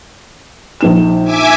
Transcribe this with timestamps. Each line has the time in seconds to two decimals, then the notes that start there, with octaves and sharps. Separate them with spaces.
0.81 A#1 D#4 E7
1.24 E5 G#5 D6